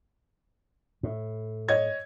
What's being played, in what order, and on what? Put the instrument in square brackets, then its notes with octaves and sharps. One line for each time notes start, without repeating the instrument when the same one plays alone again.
[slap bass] A2
[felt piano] C#5 D#5 G#6